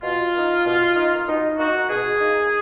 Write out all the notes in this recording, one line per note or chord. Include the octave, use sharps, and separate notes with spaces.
B2 F4
A#3 D#4
B2
A#3 D#4
B2 D#4
A#3 D#4 F#4
B2 G#4
A#3 D#4